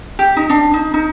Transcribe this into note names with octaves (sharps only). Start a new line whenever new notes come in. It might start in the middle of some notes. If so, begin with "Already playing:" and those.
G4
D#4
D4
D#4
D#4